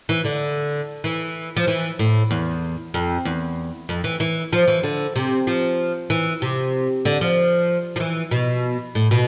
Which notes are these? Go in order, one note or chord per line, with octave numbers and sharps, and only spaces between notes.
E3
D3
E3
F3
E3
A2
E2
F2
E2
F2
E3
E3
F3
E3
D3
C3
F3
E3
C3
D3
F3
F3
E3
B2
A2
B2